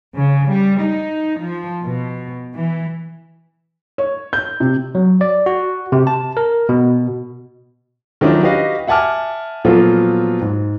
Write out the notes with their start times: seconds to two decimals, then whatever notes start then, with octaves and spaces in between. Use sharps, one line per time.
0.16 C#3
0.50 G3
0.82 D#4
1.39 F3
1.85 B2
2.55 E3
3.98 C#5
4.33 G6
4.60 C3
4.95 F#3
5.21 D5
5.46 F#4
5.92 C3
6.07 A5
6.37 A#4
6.69 B2
8.21 D#3 F3 F#3 C#4 D4 E4
8.43 F#4 G4 B4 D#5 F5
8.87 E5 F#5 G#5 A5 D6 F6
9.65 A#2 F3 F#3 B3 F4 A4
10.41 G#2